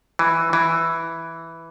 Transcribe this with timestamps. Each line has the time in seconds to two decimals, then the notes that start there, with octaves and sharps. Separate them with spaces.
0.19 E3
0.53 E3